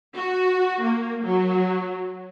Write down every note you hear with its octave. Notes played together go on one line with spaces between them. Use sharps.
F#4
A#3
F#3